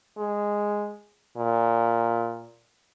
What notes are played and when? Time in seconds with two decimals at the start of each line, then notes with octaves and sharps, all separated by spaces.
0.18 G#3
1.37 A#2